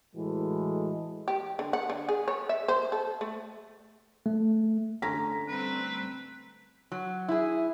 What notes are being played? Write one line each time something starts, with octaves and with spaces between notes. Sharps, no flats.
A2 E3 G#3 F#4 A4
G4
D3
F#5
D3
G#4
C#5
E5
C5
A4
A3
A3
D3 C#4 A#5 A#6 B6
G3 A3 C4 B4
F#3
E4 G#4